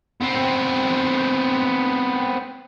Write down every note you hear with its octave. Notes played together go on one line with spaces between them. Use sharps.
B3 C4